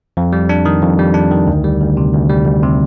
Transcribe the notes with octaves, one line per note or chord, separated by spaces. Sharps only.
F2
G3
D4
D#3
F2
G3
D4
D#3
D2
G3
D2
C3
D2
G3
D2
C3